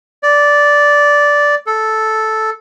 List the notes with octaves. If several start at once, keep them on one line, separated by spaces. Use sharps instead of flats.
D5
A4